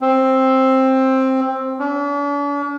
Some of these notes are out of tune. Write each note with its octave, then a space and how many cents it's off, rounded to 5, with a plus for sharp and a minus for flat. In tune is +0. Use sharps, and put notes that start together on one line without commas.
C4 +10
D4 -45